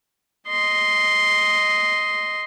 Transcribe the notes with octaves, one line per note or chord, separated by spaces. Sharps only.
D#5 C6